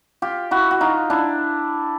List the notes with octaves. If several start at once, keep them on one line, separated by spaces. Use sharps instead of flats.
F4 G4
E4 F#4
F#4
D#4 F4
D4 E4